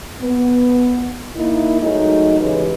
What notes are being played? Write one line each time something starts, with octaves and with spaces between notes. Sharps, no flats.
B3
A#3 D#4 E4
F#3 G#3 A3 D#4
C#3 E3 G#3 G4 B4